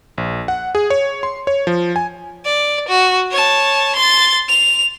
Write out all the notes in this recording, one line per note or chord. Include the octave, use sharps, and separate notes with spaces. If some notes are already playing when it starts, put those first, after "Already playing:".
A#1
F#5
G#4
C#5
C6
C#5
F3
G#5
D5
F#4
C#5 A5
C6 A6
F7